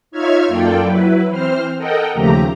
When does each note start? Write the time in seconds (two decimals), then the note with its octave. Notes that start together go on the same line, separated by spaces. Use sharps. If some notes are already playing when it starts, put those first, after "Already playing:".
0.11 D#4 F4 C#5 E5 F6 G#6
0.48 F#2 A#3 F4 A4 D5 G5
0.82 F#3 E4 B4
1.27 E3 C4 C5 F6
1.78 A4 A#4 D#5 F#5 G5
2.13 D#2 C#3 F3 A3 G4 A#5